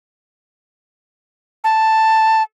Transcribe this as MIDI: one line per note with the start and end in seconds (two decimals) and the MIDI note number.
1.64 2.43 81